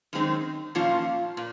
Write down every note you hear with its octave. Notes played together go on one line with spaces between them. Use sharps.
F#2 D#3 G#3 C4 D#4
A#2 F3 A#3 C#4 F4
A#2